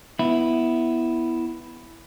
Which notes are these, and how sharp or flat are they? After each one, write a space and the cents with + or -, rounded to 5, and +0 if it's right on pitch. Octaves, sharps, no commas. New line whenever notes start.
B3 +0 E4 +0